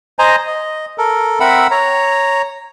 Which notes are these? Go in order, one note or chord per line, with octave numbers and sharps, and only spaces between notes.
C5 D#5 G#5 A#5
D#5
A4 A#4
C4 A#4 E5 F#5 B5 E6
C#5 A#5